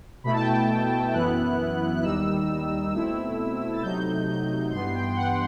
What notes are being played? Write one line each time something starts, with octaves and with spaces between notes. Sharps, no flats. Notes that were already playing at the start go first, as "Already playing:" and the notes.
B2 A3 E4 B5
A5
G5
A5
F#2 E3 B3 E4 F#6
F#6
D#2 D#3 G3 D#4 E6
B2 A3 C4 E4 E6
A6
C3 F#3 A3 D#4 G6
G6
G2 E3 B3 C6
G5
F#5